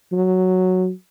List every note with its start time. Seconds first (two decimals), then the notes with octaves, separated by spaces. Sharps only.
0.13 F#3